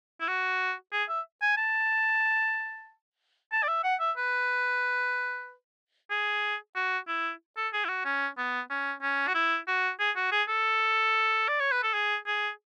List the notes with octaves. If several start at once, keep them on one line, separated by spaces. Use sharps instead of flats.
E4
F#4
G#4
E5
G#5
A5
A5
D5
E5
F#5
E5
B4
G#4
F#4
E4
A4
G#4
E4
F#4
C#4
B3
C#4
C#4
F#4
E4
F#4
G#4
F#4
G#4
A4
D5
C#5
B4
A4
G#4
G#4